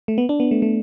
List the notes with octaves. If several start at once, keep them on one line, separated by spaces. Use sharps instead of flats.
A3
B3
D4
B3
A3
A3